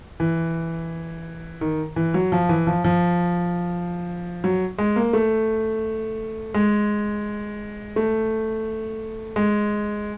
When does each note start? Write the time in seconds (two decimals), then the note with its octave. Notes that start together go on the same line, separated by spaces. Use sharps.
0.20 E3
1.61 D#3
1.96 E3
2.14 F#3
2.32 F3
2.49 E3
2.67 F3
2.84 F3
4.44 F#3
4.78 G#3
4.96 A#3
5.13 A3
6.54 G#3
7.96 A3
9.36 G#3